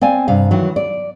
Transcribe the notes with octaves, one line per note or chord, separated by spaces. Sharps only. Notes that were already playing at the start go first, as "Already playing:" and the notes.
C4 D5 F5 G#5
G2 C3 F5
D#3 E3 F#3
D5